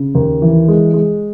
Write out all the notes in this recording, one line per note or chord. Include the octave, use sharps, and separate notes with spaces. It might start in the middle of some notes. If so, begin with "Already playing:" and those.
Already playing: C#3
D#2
E3
G#3
G#3